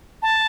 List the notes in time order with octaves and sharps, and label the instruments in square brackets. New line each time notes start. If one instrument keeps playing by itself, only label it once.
[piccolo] A5